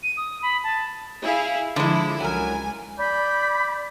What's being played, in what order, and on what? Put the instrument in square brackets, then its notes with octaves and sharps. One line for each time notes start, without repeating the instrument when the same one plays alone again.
[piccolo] D#7
D#6
B5
A5
[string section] E4 G#4 F5
[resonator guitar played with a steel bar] D3 G#3 [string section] F3 E4
[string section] C#2 G#5 [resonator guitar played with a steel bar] F#3 A#4
[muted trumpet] D5 [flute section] B5 G6